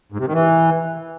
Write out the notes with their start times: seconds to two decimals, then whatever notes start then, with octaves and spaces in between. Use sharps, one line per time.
0.12 G#2
0.19 C3
0.26 D#3
0.33 E3